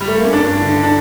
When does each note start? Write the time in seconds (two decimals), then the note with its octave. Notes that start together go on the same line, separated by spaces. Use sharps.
0.01 G3
0.08 A3
0.17 A#3
0.25 C#4
0.32 G2 D4
0.61 D3
0.83 D4